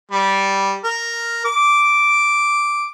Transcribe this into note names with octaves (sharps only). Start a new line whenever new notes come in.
G3
A#4
D6